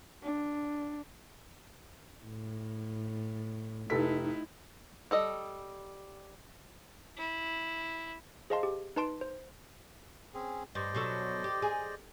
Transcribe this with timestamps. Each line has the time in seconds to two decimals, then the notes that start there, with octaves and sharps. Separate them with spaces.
0.23 D4
2.24 A2
3.90 F1 D#4 E4 A4 B6
5.11 G3 A4 D#5
7.17 E4
8.50 G#4 C5 D#5 F5 A5 C6
8.63 G4
8.96 D#4 B4 A5 C6 D7
9.21 C5
10.34 C4 C#4 G#4
10.75 G2 C5 D5 D#5
10.94 B2 F#3 A4
11.44 G4
11.62 G#4